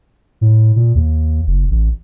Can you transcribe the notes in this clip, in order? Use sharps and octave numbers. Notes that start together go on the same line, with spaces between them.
A2
A#2
D#2
F#1
A1